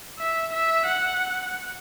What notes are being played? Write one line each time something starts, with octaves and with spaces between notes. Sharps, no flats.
E5
E5
F#5